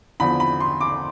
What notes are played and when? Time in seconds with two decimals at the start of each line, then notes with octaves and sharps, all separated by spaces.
0.20 E2 D3 F3 B5
0.40 B5
0.60 C6
0.81 D6